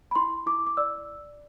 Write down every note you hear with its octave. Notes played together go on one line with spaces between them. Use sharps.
B5
E4 C6
E4 D6
D6
D5 E6